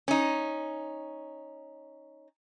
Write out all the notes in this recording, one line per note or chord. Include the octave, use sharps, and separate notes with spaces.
C#4 D#4